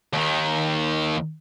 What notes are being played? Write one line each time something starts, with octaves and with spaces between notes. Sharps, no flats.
D#2 D#3